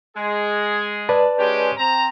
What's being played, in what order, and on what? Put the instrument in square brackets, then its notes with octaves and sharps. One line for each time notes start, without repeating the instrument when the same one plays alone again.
[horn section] G#3 G#4
[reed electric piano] B4 D5 A5
[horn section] G#3 C#4 G4
C4 A#5